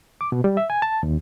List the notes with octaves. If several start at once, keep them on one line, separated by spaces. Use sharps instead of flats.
D6
B2
G3
E5
G#5
A5
D#2